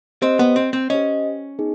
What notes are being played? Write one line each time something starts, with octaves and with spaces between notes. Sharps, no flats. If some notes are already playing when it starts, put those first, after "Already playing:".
C4 G4 C5 D#5
B3
C4
C4
C#4 G4 C5 D#5
B3 D#4 G#4